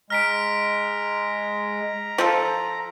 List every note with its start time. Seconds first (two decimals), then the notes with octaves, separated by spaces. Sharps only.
0.10 G#3 A#5 F6 B6 D7
2.18 F3 F4 A4